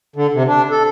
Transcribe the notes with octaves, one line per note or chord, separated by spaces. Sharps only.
D3
C3
D4
A4